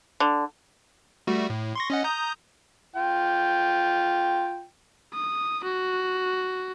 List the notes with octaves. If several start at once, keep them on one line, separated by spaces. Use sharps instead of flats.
D3
G3 A3 F#4
A2
C6 C#6 A#6
C#4 D#5 F#5
A#5 D#6 G6
F4 G5
D#6
F#4